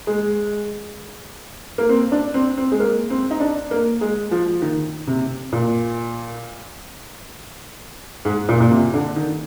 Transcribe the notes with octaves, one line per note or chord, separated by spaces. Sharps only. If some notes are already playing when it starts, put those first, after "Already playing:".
G#3
A#3
C4
D4
C4
C4
G#3
A#3
C4
D#4
D4
A#3
G#3
F3
D#3
C3
A#2
G#2
A#2
A#2
C3
D3
D#3